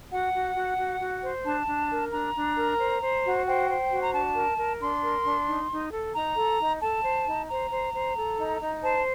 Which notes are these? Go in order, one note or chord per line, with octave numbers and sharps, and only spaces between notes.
F#4 F#5
F#4
F#4
F#4
F#4
C5
D4 A5
D4
A#4
D4 A#5
D4
A#4
C5
C5
F#4
C5 G5
C5
F#4
A#5
D4 A5
A#4
A#4
D4 C6
A#4
D4
D#4
D#4
A4
D#4 A#5
A4
D#4
A4 A5
C5
D#4
C5 A#5
C5
C5
A4
D#4
D#4
C5 A5